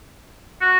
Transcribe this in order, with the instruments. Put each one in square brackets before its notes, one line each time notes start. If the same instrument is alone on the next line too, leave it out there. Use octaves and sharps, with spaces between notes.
[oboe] F#4